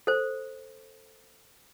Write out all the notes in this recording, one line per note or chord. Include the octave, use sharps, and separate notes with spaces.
A4 C5